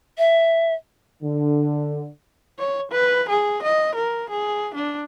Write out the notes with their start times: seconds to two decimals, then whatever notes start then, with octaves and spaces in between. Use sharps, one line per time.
0.18 E5
1.23 D3
2.59 C#5
2.92 B4
3.29 G#4
3.63 D#5
3.95 A#4
4.30 G#4
4.75 D4